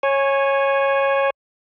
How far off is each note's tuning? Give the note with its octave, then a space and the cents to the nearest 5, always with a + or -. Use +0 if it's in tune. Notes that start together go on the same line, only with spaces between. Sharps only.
C#5 -15 G#5 +0